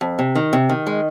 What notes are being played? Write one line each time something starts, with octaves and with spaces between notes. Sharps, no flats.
F2
C3
D#3
C3
D#3
G#3